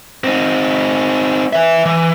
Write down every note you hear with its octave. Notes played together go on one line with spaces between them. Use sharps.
C4 D#4
B4 E5
E3